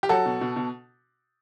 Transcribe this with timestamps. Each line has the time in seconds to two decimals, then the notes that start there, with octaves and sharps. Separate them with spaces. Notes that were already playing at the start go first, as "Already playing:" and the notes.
0.03 G4
0.09 F#3 F#4 A4
0.26 B2
0.41 B2
0.56 B2